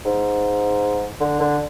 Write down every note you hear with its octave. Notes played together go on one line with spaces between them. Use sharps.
G#2
D3
D3